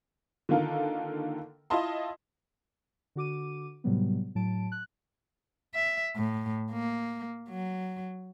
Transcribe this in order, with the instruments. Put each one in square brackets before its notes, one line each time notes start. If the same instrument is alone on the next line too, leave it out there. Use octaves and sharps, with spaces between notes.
[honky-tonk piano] D3 D#3 A#3 F4 A4 A#4
E4 F4 D#5 A5 C6
[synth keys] D3 F#4 D6 D#7
A2 C3 F#3 G3 B3
A2 F#3 A5 D7
F#6
[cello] E5
A2
A#3
F#3